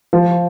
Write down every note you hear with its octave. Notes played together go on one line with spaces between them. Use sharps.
F3